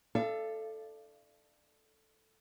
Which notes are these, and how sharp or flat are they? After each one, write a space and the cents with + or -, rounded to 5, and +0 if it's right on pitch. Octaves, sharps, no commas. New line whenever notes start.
A4 +0 D5 +20 F5 -40